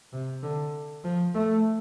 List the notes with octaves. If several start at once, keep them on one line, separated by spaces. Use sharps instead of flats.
C3
D3
F3
A3